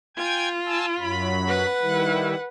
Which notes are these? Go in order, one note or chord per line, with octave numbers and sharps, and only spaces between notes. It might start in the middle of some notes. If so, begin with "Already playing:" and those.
F4 G5 G#5 G#6
G#5 A5 E6
F#2 F#3 B5
B4 F#5
D#3 G3 E4